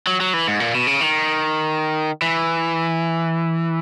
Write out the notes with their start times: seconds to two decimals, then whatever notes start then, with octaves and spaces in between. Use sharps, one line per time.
0.07 F#3
0.20 F#3
0.33 E3
0.48 G#2
0.60 A#2
0.75 B2
0.87 C#3
1.01 D#3
2.22 E3